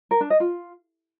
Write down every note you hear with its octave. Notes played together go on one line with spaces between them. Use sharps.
A#4
D4
D#5
F4